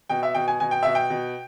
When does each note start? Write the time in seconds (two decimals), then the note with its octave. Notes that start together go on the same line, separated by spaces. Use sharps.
0.09 B2 G5
0.23 E5
0.35 B2 G5
0.48 G#5
0.60 B2 G#5
0.71 G5
0.83 B2 E5
0.95 G5
1.10 B2